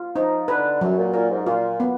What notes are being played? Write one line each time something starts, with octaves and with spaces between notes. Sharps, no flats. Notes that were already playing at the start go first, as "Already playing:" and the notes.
Already playing: F4
F3 D#4
D3 B4
F#2 F#3
A#2
A#2 A#4
G#2
A#2 F4
B3